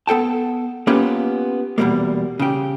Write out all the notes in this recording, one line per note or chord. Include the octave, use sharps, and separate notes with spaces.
B3 A4 G5 A5
A#3 B3 C#4 F4 G4 B4
E2 B2 F3 G3 A3 A#3
C#3 G4